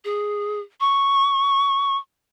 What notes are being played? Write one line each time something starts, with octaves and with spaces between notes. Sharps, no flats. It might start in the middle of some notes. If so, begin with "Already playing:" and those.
G#4
C#6